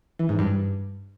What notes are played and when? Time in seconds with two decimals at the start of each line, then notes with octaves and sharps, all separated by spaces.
0.19 E3
0.29 G#2
0.39 G2